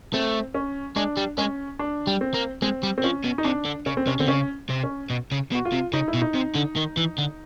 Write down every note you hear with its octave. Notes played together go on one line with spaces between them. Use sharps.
A3 C4
C#4
G#3 D4
G3
G#3 C#4
D4
G3
C4
A#3
G#3 C4
G3
C4
F3 C#4
B2
D#4
C3 D4
D3
C#3 C#4
C4
C3 C#4
D3 C4
C#3 C#4
C3
C#4
B2
C#3
B2
F#4
F4
C3
C#3 D#4
E4
B2
D#4
C3
D3
D#3
E3
D3